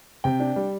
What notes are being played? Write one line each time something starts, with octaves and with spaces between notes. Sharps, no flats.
C3 G5
D4
G3